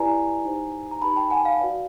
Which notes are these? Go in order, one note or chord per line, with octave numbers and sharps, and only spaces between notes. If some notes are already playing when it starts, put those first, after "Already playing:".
Already playing: E4 G4 B4 D5 G#5 A#5
D#4 G4 C5
A#5
D#4 G4 B4 A5 B5
G5 A5
F#5 G#5
F5
F#4 B4 D5